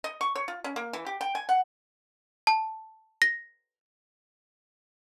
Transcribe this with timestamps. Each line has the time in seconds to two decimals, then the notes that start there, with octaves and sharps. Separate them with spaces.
0.04 D#5
0.21 C#6
0.35 C#5
0.48 F4
0.64 C#4
0.76 A#3
0.93 E3
1.06 G4
1.21 G5
1.35 G#5
1.49 F#5
2.47 A5
3.22 A#6